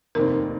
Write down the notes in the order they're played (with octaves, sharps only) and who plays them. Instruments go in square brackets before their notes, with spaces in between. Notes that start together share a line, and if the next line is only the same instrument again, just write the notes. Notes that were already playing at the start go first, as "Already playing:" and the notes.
[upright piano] F1 D#2 D#3 C4 [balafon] A#4